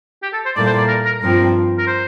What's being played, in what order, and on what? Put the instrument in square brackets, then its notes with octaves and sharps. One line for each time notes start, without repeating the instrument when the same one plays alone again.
[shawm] G4
A4
C5
[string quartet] A#2 G3 A#3 E4 A4 [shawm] D5
[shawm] C5
D5
A#4
A#4
[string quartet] G2 F3 C4 [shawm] A#4
[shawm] A#4
C5